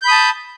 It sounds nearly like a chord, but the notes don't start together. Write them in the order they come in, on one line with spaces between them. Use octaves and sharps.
G6 B5 D#6 A5